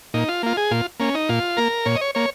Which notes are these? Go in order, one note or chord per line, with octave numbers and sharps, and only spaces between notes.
A#2 D#4
F4
A#3 F4
G#4
A#2 F4
A#3 C#4
D#4
A#2 F4
A#3 A#4
A#2 C#5
D#5
C#5
A#3 C#5